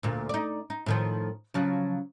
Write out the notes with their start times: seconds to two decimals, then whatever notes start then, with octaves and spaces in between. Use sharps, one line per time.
0.03 D2 A#2
0.29 D#4 D5
0.70 D#4
0.86 A2 D#3 F3
1.54 C#3 F3 F#3